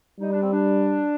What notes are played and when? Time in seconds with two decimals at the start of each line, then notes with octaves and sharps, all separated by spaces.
0.20 G3 D#4
0.32 D4
0.41 C4
0.52 D4